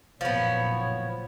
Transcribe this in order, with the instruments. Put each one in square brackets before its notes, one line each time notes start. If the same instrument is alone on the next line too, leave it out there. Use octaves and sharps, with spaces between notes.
[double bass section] F#1 A#2 [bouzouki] F3 B3 [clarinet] C#5